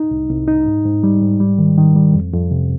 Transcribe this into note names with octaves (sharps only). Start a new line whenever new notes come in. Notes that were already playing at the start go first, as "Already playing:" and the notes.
Already playing: D#4
C2
C2
D#4
G#2
G#2
G3
G#2
G3
D#3
D#3
G3
F2
F2
C3